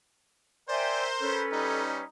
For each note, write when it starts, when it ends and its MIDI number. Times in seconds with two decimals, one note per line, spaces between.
0.69 1.44 70
0.69 1.44 72
0.69 1.06 74
0.69 1.06 76
0.69 1.06 79
0.69 1.06 80
1.20 2.02 61
1.20 1.82 69
1.20 2.02 71
1.52 2.06 55
1.52 2.06 63